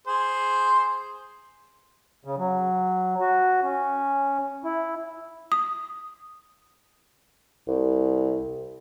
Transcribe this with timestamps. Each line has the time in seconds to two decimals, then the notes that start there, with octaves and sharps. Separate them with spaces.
0.07 G#4 C5
2.25 C#3
2.38 F#3
3.20 F#4
3.63 C#4
4.64 E4
5.52 D#6
7.68 C2